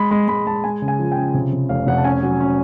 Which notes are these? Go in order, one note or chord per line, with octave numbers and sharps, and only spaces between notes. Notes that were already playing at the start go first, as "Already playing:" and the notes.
Already playing: G#3 B5
G#3 B5
G#3 B5
G#3 A5
G#3 G#5
C#3
G#5
F3
G5
C#3
C3
C3
F1 F5
F1 F#5
A5
C#4 G#5
F#3
C#4